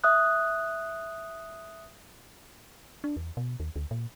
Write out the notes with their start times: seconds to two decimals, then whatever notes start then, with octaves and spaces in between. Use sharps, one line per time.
0.04 E5 D#6 F#6
3.04 D4
3.17 E2
3.37 B2
3.60 D#2
3.76 D2
3.91 A#2